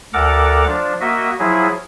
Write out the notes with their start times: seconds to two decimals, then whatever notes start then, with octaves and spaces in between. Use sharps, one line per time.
0.14 D2 A4 A#4 F#5 A#5 D6
0.67 F3 D4
1.01 A#3 F#4 D#5 E5
1.39 F3 F#3 E4 G#4